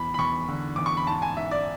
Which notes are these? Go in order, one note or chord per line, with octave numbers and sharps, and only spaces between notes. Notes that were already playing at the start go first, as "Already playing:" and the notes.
Already playing: E2 B5
B5
E2 C#6
D3
E2 D6
C#6
B5
G#2 A5
G#5
G#2 E5
D5